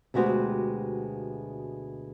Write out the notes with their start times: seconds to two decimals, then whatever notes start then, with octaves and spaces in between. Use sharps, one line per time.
0.14 D2 B2 G#3 F#4 G4 C5